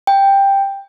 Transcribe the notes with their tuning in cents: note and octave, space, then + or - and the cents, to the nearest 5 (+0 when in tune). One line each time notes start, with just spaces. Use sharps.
G5 +10